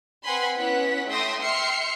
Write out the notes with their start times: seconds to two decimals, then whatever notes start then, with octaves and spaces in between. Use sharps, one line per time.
0.24 C4 B4 F#5 G#5 B5 C6
0.57 B3 C#4 E4 F#5 B6
1.07 A3 E5 G5 C6 D#6 A#6
1.41 E5 G5 C6 F6 C7 C#7